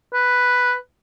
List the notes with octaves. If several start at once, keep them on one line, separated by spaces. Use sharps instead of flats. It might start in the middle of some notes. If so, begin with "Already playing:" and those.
B4